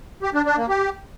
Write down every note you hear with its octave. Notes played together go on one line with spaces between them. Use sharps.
G4
D4
D4
A#3
G4